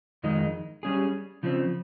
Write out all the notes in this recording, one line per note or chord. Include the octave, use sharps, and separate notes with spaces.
F2 D#3 G#3 D#4
G3 C#4 G#4
C#3 F3 C4